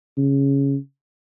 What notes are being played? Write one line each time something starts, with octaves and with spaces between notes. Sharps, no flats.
C#3